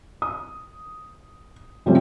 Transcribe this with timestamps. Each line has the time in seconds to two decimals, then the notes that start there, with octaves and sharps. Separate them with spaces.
0.22 D#6
1.86 C3 F3 G3 A3 C4 C#4